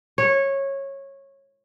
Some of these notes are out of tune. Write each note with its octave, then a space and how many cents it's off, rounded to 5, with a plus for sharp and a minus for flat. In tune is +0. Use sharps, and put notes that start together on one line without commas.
C#5 -15